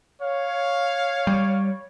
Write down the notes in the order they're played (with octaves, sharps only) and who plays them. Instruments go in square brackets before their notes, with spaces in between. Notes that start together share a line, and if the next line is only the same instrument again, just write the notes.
[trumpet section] C#5 [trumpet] F5
[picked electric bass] G3